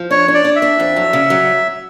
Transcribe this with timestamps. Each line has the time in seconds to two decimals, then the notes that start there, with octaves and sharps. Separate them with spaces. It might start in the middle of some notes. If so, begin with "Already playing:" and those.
Already playing: F3
0.11 D4 C#5
0.28 D4
0.34 D5
0.45 D4
0.56 E5
0.62 D4
0.80 F2
0.96 F#3
1.13 C#3
1.30 F#3